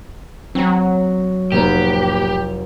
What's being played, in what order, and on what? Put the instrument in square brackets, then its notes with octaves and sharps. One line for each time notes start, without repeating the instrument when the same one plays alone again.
[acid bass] F#3 [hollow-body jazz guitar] C4 A#5
[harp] F1 C5 A#5 [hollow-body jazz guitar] A2 A#3 B3 [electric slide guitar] G4